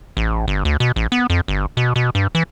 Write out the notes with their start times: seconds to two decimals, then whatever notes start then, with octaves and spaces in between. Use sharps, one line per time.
0.17 A1
0.48 G1
0.65 D2
0.80 B2
0.96 A1
1.12 B3
1.30 F2
1.48 G1
1.77 B2
1.96 B2
2.15 G2
2.35 E3